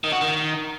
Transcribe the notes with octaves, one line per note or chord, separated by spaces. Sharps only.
D#3
F#4
D#3